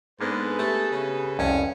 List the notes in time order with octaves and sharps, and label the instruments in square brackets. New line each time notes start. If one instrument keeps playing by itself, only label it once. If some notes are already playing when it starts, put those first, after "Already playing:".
[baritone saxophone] G#2 [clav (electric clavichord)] A#3 B3 D4 [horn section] G#4 A4 B4
[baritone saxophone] A3 [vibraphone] G4
[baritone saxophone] C#3
[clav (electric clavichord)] C2 F2 [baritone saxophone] C#4